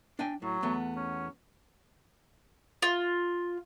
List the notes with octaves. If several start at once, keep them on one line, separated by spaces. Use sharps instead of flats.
D4 G5 G#5
A2 F#3
E2 A3 B3
C#4
F4